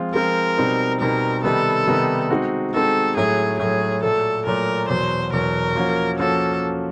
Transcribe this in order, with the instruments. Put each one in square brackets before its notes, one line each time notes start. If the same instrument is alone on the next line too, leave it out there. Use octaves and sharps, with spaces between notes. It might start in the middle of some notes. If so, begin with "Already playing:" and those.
Already playing: [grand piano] F3 G#3 C4 F4
[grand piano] F3 G#3 C4 F4 [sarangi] A#4
[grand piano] B2 G3 C4 D#4
[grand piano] B2 G3 C4 D#4 [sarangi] A#4
[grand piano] C3 D#3 G3 B3 D#4 [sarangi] A4
[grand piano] C3 D#3 G3 B3 D#4
G#3 C4 D#4 F#4
[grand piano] G#3 C4 D#4 F#4 [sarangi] A4
[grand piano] A2 F#3 A3 [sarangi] G#4
[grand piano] A2 F#3 A3 [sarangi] G#4
[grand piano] A#2 F#3 A3 [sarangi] A4
[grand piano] A#2 F#3 A3 [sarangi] A#4
[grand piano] E2 B2 F#3 [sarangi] C5
[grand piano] E2 B2 F#3 [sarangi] A#4
[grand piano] F3 A#3 C#4 F#4
[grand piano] F3 A#3 C#4 F#4 [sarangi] A4